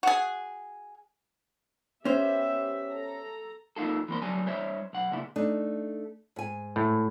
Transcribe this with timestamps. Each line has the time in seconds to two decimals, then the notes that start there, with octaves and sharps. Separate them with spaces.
0.03 F#4 G#4
2.05 B3 C#4 G4 C5 E5
2.89 A4 A#5
3.76 F2 A#3 D#4 F4 A4
4.08 E3 A#3 C5
4.22 D2 F#3 G3 G#5 A5
4.46 G3 C5 C#5 E5
4.93 B1 F#5
5.11 D2 A#2 C#3 E4
5.36 A3 D4 D#4
6.36 G#2 G#5
6.76 A2